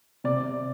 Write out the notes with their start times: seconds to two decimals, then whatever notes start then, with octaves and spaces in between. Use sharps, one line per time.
0.24 C3 D5